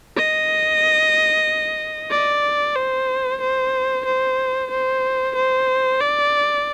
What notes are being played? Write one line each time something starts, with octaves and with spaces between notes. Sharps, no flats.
D#5
D5
C5
C5
C5
C5
C5
D5